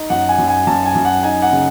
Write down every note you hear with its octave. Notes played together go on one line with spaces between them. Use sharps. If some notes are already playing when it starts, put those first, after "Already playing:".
Already playing: D#4
F#2 F#5
G#5
F#2
G#5
F#2 A5
G#5
F#2
F#5
D#4 G#5
F#5
C#3